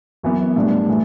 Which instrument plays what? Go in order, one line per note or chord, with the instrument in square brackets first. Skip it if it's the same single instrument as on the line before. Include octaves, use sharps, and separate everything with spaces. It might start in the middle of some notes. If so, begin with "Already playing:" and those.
[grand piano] F#2 E3 B3
A2 G3 D4
A2 E3